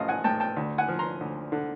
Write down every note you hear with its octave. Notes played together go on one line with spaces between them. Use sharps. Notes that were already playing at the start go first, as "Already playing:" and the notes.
Already playing: A1 F3 D#5 F5
F#5 G#5
A2 G5 A5
G5 A5
D2
F#5 G#5
F3
A#5 C6
D2
D3